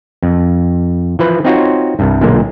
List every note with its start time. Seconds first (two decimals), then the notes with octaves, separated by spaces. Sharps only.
0.23 F2
1.19 E3 F3 B4
1.45 C4 D#4 F4 F#4 C#5
1.99 C2 G2
2.21 B1 A#2 D3 G#3 A#3